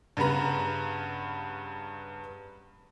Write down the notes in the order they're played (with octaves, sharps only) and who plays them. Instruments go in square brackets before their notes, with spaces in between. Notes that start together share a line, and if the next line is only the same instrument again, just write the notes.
[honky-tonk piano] G2 C#3 B3 B4 A#5